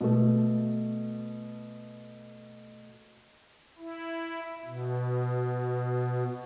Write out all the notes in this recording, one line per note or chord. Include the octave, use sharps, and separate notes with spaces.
B2 A3
E4
B2